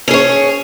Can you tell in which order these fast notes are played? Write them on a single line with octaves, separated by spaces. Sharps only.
C#4 G#4 C#5